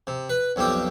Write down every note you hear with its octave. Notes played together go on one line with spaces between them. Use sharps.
C3
B4
B1 F2 G3 C4 G4